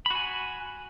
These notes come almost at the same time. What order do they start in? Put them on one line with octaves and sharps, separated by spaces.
B5 F#4 G#5